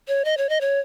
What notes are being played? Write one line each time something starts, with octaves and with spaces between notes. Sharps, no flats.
C#5
D#5
C#5
D#5
C#5